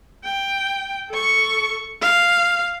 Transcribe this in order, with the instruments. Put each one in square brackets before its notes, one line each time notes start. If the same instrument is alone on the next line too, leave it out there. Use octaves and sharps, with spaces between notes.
[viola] G5
A4 C#6
F5